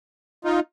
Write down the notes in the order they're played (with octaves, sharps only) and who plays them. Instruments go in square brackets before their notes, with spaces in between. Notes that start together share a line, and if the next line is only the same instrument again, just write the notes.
[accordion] D#4 F4